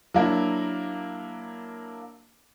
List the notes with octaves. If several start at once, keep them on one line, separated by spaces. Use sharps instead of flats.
F#3 A#3 D4 E4